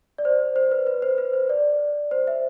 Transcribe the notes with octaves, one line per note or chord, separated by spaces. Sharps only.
D5
C5
C5
B4
B4
C5
B4
C5
D5
C5
E5